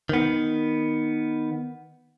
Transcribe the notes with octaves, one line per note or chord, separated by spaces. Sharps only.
D#3 B3